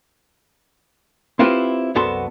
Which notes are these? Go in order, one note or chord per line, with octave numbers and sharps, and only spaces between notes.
C4 E4 F4 G4 B4 C5
C2 F#2 B3 F#4 A4 C6